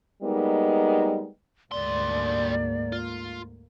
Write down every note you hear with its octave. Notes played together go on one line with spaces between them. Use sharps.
G3 G#3 A#3 B3 D#4
D2 G#2 G3 A#3 D5 C6
F4